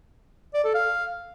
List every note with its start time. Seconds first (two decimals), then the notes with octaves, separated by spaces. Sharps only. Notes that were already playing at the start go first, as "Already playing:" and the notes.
0.54 D5
0.64 A4
0.74 F5